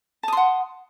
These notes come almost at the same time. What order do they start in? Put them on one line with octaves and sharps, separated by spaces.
A5 D#6 C6 F#5